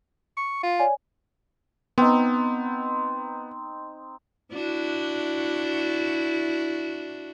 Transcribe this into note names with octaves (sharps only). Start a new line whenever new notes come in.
C#6
F4
C#5 D5 G#5
B3 C4 D#4
D4 E4 F#4